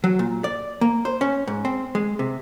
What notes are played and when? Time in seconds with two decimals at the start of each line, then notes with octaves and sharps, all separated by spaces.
0.04 F#3
0.19 A#2
0.44 D5
0.81 A#3
1.05 C5
1.21 C#4
1.47 G#2
1.65 C4
1.95 G#3
2.19 C3